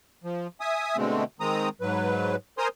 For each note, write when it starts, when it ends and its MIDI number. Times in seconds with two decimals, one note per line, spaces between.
0.24 0.47 53
0.61 0.97 76
0.61 0.97 80
0.61 0.97 87
0.97 1.24 47
0.97 1.24 50
0.97 1.24 56
0.97 1.24 57
0.97 1.24 60
1.40 1.69 51
1.40 1.69 56
1.40 1.69 60
1.40 1.69 82
1.40 1.69 87
1.81 2.36 44
1.81 2.36 54
1.81 2.36 71
2.58 2.68 70
2.58 2.68 72
2.58 2.68 80
2.58 2.68 82
2.58 2.68 84
2.58 2.68 87